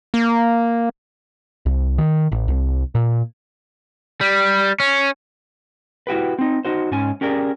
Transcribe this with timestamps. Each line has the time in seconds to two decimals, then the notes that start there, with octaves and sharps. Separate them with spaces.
0.14 A#3
1.66 C2
1.98 D#3
2.32 A1
2.48 C2
2.95 A#2
4.21 G3
4.80 C#4
6.07 E4 F#4 G4 B4
6.39 C4 D#4
6.65 D#4 F#4 C5
6.91 G#2 C#4 G#5
7.21 C#4 G4 G#4 A#4 D5